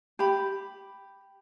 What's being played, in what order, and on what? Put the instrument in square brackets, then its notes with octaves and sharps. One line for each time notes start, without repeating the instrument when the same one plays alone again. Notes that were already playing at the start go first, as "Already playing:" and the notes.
[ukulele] G4 B5